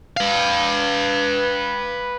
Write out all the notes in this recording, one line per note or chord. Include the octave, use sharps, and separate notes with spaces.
B4 F5